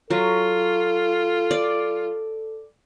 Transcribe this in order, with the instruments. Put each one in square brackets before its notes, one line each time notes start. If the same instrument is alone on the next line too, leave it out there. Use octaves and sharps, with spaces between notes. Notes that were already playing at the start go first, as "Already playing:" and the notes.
[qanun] F#3 [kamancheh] F4 [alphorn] A4
[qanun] D5